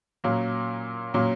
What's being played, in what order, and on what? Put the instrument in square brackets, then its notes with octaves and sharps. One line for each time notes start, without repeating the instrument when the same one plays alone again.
[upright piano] A#2 F#3 A#3 C#4
A#2 F#3 A#3 C#4